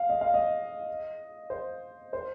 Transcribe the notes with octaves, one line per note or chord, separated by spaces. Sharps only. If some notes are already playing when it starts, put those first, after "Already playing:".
Already playing: F5
D#5
F5
D#5
C5
C5